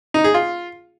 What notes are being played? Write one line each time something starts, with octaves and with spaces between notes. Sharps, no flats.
D#4
G#4
F4